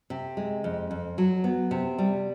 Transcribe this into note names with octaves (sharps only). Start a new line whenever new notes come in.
C3
G#3
F2
F2
F#3
B3
C3
G3